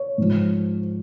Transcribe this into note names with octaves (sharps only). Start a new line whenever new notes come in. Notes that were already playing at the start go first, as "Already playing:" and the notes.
Already playing: C#5
G#2 F3